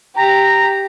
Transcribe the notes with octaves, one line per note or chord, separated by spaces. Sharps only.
G4 A#5